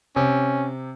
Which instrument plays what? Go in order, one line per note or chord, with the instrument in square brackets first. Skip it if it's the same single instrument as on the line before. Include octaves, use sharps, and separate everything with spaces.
[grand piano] C3 [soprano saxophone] C#4